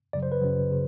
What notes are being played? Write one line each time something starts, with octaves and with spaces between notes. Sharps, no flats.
F#2 C#3 F#3 D5
C5
B4
F#2 C#3 F#3
C#3